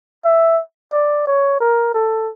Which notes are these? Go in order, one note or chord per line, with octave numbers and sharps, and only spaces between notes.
E5
D5
C#5
A#4
A4